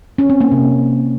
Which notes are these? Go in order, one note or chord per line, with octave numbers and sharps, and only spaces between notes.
C#4
C4
A#3
C3